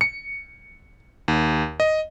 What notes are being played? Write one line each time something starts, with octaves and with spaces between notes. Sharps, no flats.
C#7
D#2
D#5